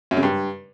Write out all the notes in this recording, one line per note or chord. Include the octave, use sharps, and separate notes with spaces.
F#2
C#3
G2